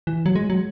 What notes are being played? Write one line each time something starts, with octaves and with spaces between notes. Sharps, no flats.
E3
F#3
G#3
F#3